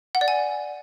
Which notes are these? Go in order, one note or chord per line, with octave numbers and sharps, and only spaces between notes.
F#5
D5
G#5